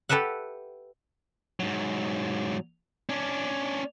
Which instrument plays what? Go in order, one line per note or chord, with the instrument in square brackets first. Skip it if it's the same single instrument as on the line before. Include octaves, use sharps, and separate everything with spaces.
[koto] G4 A4 B4 E5 F#5
[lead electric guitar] G#2 F#3
C#4 D4